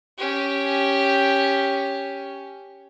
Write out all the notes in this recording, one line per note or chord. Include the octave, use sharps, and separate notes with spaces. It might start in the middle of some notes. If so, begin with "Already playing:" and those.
C#4 G4